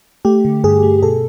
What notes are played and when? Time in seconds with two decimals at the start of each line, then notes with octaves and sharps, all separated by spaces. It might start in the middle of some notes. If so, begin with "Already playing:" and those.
0.25 A3 G4
0.45 D3
0.64 G2 G#4
0.83 A3
1.03 B2 A4